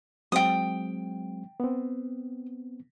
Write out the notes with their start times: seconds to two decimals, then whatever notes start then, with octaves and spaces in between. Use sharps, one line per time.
0.32 F#3 G#3 C4 G5 D#6
1.60 B3 C4